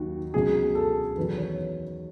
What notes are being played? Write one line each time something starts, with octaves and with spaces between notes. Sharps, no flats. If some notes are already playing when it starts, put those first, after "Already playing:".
Already playing: D#2 D#3 F#3 F#4
C#2 B2 F#3 G#4
A4
E2 D#3 F#3 B4
C#5